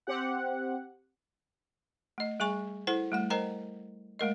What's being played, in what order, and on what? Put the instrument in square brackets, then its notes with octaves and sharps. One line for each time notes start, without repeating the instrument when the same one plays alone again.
[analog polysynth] C4 G4 F#5
[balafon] A3 D#5
G3 G#4 G#5 C#6
E4 A4 C5 F#5
G3 A3 F#5
A#4 C5 D#5 G5 A#5
G#3 A3 A#4 D#5